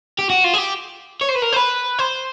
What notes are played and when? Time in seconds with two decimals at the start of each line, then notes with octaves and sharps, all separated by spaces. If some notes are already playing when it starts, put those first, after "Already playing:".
0.19 G4
0.30 F#4
0.44 F4
0.54 G#4
0.58 G4
1.21 C#5
1.29 C5
1.35 B4
1.42 A#4
1.53 C5
1.57 B4
1.99 C5